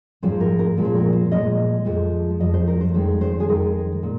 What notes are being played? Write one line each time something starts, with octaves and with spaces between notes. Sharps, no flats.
G#2 F3 G#3 C5
A#4
A#4
A#2 F3 G#3
C5
A#4
C5
A#2 F3 G#3 D#5
F2 F3 G#3
F2 F3 G#3 D#5
C5
A#4
C5
F2 D#3 G#3 C5
C5
G#4
F2 D#3 G#3 A#4
A#2